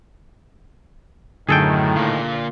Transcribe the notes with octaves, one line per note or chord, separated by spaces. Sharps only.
F#2 A2 D3 D#3 G#4 A4 G5
A#3 F4